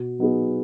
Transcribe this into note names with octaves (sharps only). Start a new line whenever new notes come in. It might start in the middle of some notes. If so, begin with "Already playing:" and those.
Already playing: B2
F#3 B3 D#4 G#4